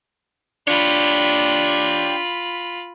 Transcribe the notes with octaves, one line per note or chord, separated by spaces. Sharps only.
D4 F4 G4 C#5 B5